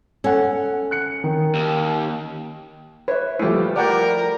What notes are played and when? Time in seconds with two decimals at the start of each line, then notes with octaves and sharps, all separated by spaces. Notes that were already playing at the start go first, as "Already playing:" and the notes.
0.24 C#4 A4 F#5
0.91 F#6 C#7
1.24 D#3
1.55 D#2
3.08 B4 C#5 E5
3.39 F3 G3 A3 E4 G4 B4
3.76 A#4 D5 F#5 G5